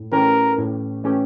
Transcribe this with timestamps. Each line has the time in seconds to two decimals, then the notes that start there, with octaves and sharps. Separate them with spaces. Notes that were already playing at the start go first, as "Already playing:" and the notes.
Already playing: A2
0.12 E3 A3 C#4 G4 A#4
0.58 A2
1.04 E3 A3 C#4 G4